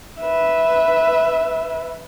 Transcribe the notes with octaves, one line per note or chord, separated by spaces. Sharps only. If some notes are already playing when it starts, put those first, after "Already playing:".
B4 E5